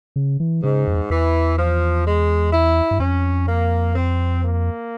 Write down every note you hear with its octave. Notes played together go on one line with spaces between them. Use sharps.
C#3
E3
G#2 C#3
F2
E2
E2 E3
F3
G#3
E4
G2
F2 C#4
A#3
C4
A#3